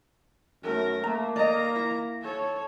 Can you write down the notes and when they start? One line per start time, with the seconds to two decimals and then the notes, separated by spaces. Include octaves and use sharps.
0.63 F#2 A3 A#4
1.04 A3 A#3 A#5
1.36 D5 D#5 A#5
1.76 E4
2.22 A4 C#5